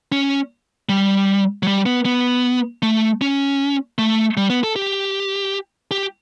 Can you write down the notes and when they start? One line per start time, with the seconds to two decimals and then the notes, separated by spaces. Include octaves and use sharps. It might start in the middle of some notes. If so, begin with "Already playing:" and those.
0.12 C#4
0.89 G3
1.63 F#3
1.67 G3
1.86 B3
2.05 B3
2.83 A3
3.21 C#4
3.98 A3
4.37 G3
4.50 B3
4.63 A4
4.76 G4
5.91 G4